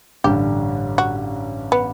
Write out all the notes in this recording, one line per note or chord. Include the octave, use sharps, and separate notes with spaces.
A1 G2 D3 G3 G4
F#4
B3